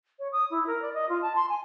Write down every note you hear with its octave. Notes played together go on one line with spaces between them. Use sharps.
C#5
D#6
E4
A#4
D5
D#5
F4
A5
C6
G#5